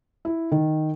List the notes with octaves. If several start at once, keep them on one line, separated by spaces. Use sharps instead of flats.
E4
D#3